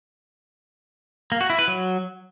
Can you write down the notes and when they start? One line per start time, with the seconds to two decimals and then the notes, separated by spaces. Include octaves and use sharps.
1.32 A#3
1.41 F#4
1.50 E4
1.59 B4
1.68 F#3